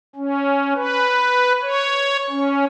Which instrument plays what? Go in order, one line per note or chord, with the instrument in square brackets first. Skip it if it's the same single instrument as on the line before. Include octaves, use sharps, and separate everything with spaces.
[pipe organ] C#4
B4
C#5
C#4